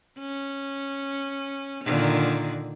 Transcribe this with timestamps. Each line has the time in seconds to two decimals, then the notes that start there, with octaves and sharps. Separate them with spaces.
0.19 C#4
1.84 A#2 D3 D#3